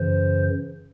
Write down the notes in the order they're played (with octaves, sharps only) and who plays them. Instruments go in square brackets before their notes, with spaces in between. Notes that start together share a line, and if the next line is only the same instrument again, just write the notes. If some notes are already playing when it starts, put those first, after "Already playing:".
Already playing: [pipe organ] F#2 C#3 E3 C5